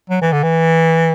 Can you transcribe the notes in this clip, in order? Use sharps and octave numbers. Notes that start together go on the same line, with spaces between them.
F#3
E3
D3
E3